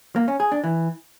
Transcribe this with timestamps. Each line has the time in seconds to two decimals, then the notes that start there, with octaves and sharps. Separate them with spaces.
0.16 A#3
0.28 C#4
0.40 G#4
0.52 D4
0.64 E3